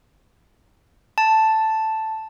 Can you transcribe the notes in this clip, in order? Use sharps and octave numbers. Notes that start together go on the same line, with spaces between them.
A5